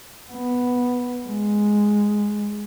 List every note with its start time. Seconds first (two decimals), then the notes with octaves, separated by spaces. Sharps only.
0.32 B3
1.28 G#3